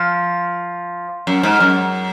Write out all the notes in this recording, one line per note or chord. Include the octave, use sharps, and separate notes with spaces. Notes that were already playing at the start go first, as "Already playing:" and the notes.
Already playing: F3
F#2
G#2
F#2